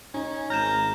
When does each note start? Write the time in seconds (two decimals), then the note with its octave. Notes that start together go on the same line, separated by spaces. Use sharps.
0.14 C#4 D#4
0.50 G#1 A#5 F6 G6 E7